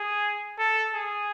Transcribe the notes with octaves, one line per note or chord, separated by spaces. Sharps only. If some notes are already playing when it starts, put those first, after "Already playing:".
Already playing: G#4
A4
G#4